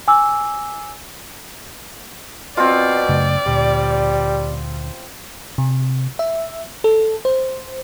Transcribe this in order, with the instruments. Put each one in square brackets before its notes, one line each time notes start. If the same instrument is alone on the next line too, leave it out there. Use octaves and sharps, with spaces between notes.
[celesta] G#5 D6 E6
[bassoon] B2 [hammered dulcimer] C4 F4 [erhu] D5
[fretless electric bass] F#2 C#3 A3
[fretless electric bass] D2 A#2 [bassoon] G3
[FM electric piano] C3
E5
A4
C5